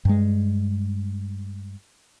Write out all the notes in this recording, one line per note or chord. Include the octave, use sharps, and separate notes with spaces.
G2 G#3